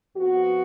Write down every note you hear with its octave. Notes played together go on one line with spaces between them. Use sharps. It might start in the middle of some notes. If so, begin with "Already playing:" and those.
F2 F3 B3 F#4